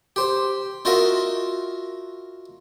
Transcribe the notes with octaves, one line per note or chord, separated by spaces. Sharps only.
G4 C5
D#4 F4 F#4 A#4 D#5 E5